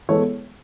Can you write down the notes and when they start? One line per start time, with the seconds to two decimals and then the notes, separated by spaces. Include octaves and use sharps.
0.09 E3 G#3 B3 A4 C#5